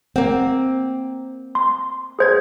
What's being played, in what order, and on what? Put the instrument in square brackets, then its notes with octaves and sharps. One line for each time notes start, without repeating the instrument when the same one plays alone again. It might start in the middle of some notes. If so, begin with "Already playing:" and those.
[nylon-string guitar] A#3 C4 [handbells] F#5
[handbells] C6
G#4 C5 G#6